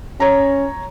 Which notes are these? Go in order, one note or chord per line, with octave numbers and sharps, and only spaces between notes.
C#4 C#5 A#5